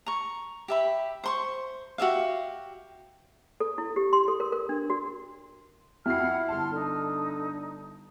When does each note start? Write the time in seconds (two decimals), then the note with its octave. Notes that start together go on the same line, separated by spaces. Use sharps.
0.06 A#5 C#6
0.68 G4 E5 B5
1.24 C5 C6 C#6
1.98 F#4 G4 E5 F5
3.60 A4
3.78 E4
3.96 G4
4.13 C6
4.28 A4
4.40 A#4
4.52 A#4
4.69 D4
4.90 F#4
6.06 F2 E4 F#4 F#5 B5 F6 C7
6.49 G1 A5 C6 F6
6.72 D3 D#4